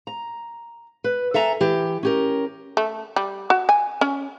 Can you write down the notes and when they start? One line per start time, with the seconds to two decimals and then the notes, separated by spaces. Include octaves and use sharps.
0.07 A#5
1.04 B4
1.34 A4 E5 G#5 A#5
1.60 E3 G4 G5
2.03 C#4 G4 A#4
2.77 A3
3.16 G3
3.50 F#4
3.69 G#5
4.01 C#4